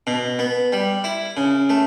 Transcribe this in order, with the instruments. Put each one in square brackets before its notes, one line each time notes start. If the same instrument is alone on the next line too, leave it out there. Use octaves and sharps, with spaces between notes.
[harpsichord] B2
B3
G3
E4
C#3
A3